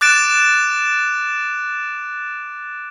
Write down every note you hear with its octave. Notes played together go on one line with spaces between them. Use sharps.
D6 F#6 A6 D7 E7